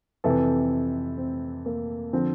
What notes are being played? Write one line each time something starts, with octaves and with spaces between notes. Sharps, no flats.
F2 C3 E3 A4
C4
A#3
D3 F3 C4